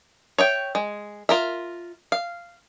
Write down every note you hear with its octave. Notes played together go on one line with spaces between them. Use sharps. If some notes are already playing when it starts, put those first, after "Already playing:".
C#5 E5 G5
G#3
F4 A#4 E5
F5